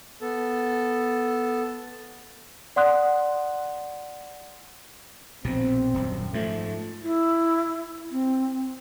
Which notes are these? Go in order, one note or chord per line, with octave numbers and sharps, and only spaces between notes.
B3 A4
D5 F#5 C6 D#6 F#6
A#1 B2 C4
D#1 F#2
G#2 F3 A3
E4
C4